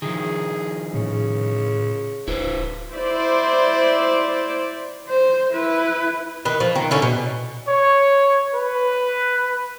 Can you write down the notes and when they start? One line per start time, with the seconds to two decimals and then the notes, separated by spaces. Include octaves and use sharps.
0.02 D#3 F3 G#4
0.94 A2 C#3
2.28 D1 E4 B4 C5
2.94 E4 C5 D5
5.08 C5
5.53 E4 B4
6.45 D#3 B4
6.60 F3
6.76 D#3
6.91 D3 C#4 E4
7.02 B2
7.68 C#5
8.55 B4